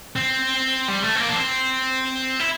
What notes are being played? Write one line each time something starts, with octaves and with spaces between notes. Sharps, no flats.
C4
G3
A3
C4
A#3
D4
C4
E4